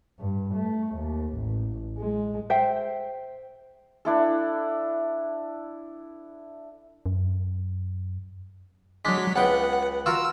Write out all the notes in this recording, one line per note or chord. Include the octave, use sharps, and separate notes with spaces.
G2
A3
D#2
A1
G#3
C5 E5 G5
D4 E4 A4
F#2
F#3 G#3 D4 B6
C#2 B3 F#5 G5
F4 F#4 A#4 E6